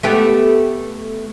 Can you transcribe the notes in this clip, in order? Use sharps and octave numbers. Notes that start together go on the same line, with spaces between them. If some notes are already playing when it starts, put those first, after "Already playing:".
A3 B3 G4